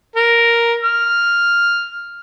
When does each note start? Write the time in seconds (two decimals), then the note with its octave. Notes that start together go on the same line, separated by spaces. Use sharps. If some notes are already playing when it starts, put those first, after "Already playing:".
0.16 A#4
0.82 F6